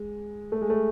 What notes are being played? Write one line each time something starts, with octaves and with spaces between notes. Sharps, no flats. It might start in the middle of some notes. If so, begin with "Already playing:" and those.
Already playing: G#3
A3
G#3
A3